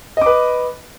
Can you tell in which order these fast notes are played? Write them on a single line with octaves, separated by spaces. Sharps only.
D#5 D6 B4